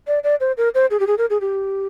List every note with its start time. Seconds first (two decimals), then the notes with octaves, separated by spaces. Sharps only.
0.07 D5
0.24 D5
0.40 C5
0.57 A#4
0.74 C5
0.91 G#4
1.00 G4
1.07 G#4
1.18 A#4
1.30 G#4
1.41 G4